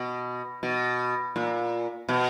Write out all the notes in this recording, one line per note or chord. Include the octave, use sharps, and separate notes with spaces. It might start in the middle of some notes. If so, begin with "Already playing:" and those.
Already playing: B2
B2
A#2
B2